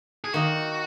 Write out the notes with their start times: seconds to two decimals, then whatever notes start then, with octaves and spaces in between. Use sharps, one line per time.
0.24 G#4
0.33 D#3 A#3 D#4 F#4